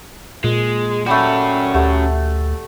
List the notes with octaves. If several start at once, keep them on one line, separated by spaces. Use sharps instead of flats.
A#2 G#3
G3 A3 C#4 F#4
D2 A3 G4 F#5